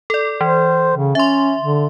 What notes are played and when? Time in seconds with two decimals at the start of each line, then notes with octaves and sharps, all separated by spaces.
0.10 A4 D5
0.41 E3 C5
0.96 C#3
1.15 C#4 E5 C6
1.61 D3